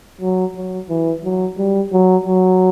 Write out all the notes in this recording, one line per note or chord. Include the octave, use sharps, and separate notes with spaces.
F#3
F#3
E3
F#3
G3
F#3
F#3